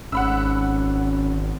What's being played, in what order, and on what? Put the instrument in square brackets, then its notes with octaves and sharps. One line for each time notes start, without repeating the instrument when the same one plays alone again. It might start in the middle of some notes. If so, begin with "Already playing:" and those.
[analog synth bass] G#1 [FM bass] C#4 [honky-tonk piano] F#5 B5 E6